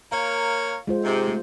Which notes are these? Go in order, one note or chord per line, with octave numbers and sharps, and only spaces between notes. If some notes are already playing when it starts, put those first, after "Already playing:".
A#3 A#4 C#5 F5
G#3 F4 C5
G#2 C3
A3